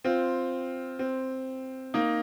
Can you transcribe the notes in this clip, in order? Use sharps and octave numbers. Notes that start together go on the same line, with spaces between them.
C4 F4
C4
A#3 D#4